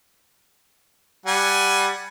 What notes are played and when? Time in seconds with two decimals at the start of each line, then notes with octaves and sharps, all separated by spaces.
1.26 G3 F#5 G#5